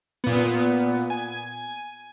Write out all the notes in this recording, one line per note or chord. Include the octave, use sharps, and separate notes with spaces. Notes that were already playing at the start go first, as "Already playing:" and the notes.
A#2 B3
G#5